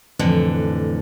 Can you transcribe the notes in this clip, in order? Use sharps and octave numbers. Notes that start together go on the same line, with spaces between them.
F2 A2 D3 E3